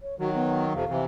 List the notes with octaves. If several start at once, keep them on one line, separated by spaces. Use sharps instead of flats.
C#5
D#3 F#3 F#4
B3
F2 C3 F5
C3 E3